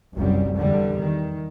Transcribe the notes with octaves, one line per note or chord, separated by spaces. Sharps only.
F1 C2 F#2 G3
E2 D3 G3
D#3